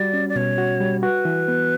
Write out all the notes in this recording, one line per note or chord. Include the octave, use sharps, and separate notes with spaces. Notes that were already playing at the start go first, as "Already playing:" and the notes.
Already playing: G3 F#4 D5
C#4
D5
B2 C#5
F#4
G3
F#4 B4
E3
B3